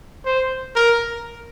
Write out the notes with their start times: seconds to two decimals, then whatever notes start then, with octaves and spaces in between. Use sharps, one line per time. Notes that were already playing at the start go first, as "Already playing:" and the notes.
0.25 C5
0.76 A#4